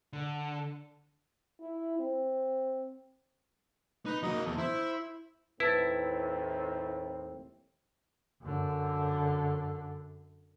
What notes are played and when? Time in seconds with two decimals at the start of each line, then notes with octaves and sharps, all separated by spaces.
0.13 D3
1.61 E4
1.99 C4
4.06 D#4 B4
4.23 F#3 A#3 D#4 D#5
4.45 E2 A4
4.58 E4 C5 E5
5.60 D#2 A2 C4 E4 B4 A5 A6
8.41 F#2 D3